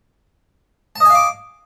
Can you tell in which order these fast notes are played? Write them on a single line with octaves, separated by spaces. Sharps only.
A5 D#5 G#5 F5 D6